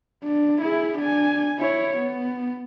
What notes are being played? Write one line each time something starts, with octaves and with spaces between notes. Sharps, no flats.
D4
E4 G#4
D4 G#5
E4 C#5
B3